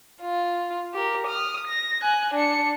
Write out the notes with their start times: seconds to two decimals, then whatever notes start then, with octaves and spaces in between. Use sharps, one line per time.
0.22 F4
0.94 G4 A#4
1.27 D#6 F6
1.67 A#6
2.02 G#5 F#6
2.34 D4 C#7